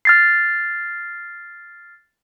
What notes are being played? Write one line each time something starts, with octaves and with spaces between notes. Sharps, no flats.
F6 A6 C7